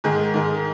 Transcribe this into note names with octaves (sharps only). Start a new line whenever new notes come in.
G#2 D#3 G#3 G#4
G#2 D#3 G#3